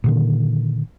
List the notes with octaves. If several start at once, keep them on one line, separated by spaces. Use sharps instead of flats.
A#2 D3 D#3